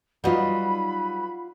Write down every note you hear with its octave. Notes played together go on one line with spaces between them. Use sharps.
F#3 G3 D#4 F4 F#4 B4 F#5 B5